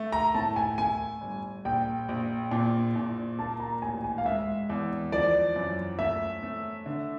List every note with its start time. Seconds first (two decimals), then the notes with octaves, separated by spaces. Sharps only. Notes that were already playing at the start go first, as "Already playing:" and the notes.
Already playing: A3
0.12 A#5
0.34 A2 A5
0.56 G#5
0.78 A3 G#5
1.21 G1
1.65 A#1 G5
2.09 A#1
2.51 A#2
2.96 A#2
3.39 A#3 A5
3.60 A#5
3.82 A1 G#5
4.04 G#5
4.18 F5
4.25 G#3 E5
4.69 E2
5.12 F3 D5
5.56 F#2
5.99 A3 E5
6.43 A3
6.86 D3